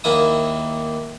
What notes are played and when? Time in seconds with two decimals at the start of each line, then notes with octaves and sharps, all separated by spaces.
0.04 D#2 A#3 E4 D#6